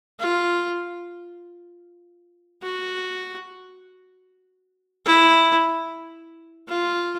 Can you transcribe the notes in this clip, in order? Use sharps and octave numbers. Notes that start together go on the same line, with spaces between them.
F4
F#4
E4
F4